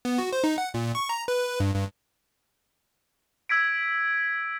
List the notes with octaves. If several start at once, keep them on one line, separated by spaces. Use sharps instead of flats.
B3
F#4
C5
D#4
F#5
A#2
C#6
A#5
B4
G2
G2
E6 G#6 B6 D7